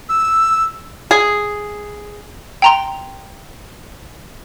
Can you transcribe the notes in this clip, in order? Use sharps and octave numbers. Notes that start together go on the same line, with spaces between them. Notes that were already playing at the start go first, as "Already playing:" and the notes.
E6
G#4
G5 A#5 C6